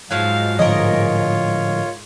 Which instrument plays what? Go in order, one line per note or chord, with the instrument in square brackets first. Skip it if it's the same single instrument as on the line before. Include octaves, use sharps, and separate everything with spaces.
[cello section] G#2 [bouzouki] F3 F#3 [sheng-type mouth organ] F5
[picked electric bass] A2 D3 F3 [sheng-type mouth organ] F4 C#5 [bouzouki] A#4 D#5